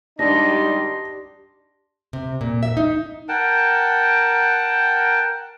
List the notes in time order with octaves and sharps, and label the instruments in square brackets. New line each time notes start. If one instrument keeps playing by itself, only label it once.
[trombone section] G#1 G3 D#4 [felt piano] D4 [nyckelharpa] G4 C6 [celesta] A#6
[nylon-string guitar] C3
A#2
E5
D#4
[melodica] A#4 F#5 G5 A5